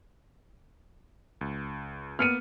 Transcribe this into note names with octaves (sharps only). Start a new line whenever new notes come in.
C#2
A#3 B3 F6 C#7 D#7